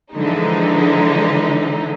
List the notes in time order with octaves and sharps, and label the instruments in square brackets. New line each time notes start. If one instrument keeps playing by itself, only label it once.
[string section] D3 E3 F3 G#3 D#4